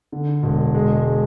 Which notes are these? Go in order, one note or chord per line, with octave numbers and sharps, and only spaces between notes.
D3
E1
G#3